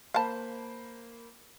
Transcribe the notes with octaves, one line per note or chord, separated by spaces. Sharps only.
A#3 C5 F5 A5 B5